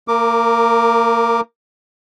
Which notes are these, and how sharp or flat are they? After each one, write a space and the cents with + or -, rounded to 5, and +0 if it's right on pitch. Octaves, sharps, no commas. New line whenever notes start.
A#3 -30 A#4 +0 D6 +0